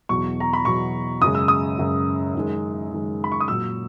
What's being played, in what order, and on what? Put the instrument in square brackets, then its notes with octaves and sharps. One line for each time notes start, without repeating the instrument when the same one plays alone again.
[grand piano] E2 B2 F#3 C#6
A#5
B5
E2 B2 F#3 C#6
F#2 C#3 G#3 D#6
E6
D#6
F#2 C#3 G#3
F#2 D#3 G#3
F#2 D#3 G#3
B5
C#6
D#6
A#2 F#3 E6